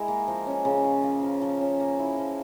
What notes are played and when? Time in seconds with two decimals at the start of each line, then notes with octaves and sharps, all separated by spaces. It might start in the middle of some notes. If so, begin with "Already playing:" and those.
Already playing: G#3 E4 A#4
0.08 A#3
0.28 F3
0.47 C#4
0.65 C#3
0.84 F4
1.03 A#3
1.23 F3
1.42 F3
1.61 C#4
1.80 A#3
1.99 E4
2.18 F3